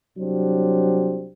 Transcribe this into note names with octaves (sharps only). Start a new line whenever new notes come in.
C2 F#3 D4 G4 C5